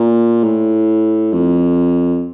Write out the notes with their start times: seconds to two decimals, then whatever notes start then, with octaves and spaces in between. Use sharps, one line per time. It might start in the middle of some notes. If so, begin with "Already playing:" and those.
Already playing: A#2
0.44 A2
1.33 F2